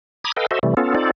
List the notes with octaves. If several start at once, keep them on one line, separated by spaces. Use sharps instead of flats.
A#5 B5 D6 D#6 G#6
A4 B4 D#5 F5 G5
F#4 A4 C5 D#5 E5
C3 E3 G3 A3
B3 C#4 F4 A4
C4 D#4 F4 A4 D5